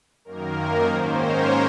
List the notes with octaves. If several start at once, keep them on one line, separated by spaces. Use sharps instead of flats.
F#2 D#3 A#3 A#4
G#2 D#3 A#3 C#4 C5
A#4 C#5